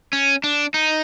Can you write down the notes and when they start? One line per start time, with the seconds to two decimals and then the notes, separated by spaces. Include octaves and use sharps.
0.13 C#4
0.44 D4
0.74 D#4